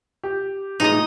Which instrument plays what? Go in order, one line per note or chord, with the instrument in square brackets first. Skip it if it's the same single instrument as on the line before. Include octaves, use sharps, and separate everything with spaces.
[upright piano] G4
[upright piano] A1 A#2 G#3 [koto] D#4 D#5